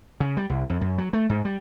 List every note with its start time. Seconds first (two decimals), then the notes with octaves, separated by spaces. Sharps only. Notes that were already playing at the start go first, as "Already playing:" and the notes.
0.20 C#3
0.37 G3
0.49 C2
0.70 F2
0.81 F#2
0.98 F#3
1.13 A3
1.29 G#2
1.45 G3